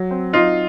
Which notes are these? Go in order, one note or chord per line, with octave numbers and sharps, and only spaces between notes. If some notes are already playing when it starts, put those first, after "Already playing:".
Already playing: F#3
C4
F#3 D#4 F4